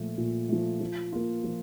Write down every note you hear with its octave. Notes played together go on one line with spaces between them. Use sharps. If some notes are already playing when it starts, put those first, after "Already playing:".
Already playing: A#2 F3 A3
A#2
F3 A3
F3
A#3 F4
F3